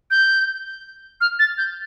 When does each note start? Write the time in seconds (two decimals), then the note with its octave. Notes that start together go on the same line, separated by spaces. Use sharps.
0.11 G6
1.21 F6
1.39 A6
1.58 G6